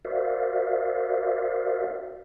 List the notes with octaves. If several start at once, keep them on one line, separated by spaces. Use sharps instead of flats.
F#4 A#4 C5 D5 E5 F5